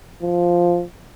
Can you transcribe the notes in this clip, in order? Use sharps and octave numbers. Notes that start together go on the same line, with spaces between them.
F3